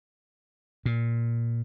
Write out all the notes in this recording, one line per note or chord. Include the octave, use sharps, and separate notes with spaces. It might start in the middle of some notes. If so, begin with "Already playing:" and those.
A#2